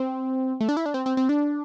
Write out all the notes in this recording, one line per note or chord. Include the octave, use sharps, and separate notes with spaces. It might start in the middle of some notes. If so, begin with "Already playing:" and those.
Already playing: C4
A3
D4
E4
D4
C4
C4
C4
D4